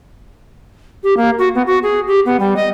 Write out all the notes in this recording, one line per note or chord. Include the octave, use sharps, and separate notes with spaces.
G4
A#3
F#4
B3
F#4
G#4
G4
B3
G3
D#5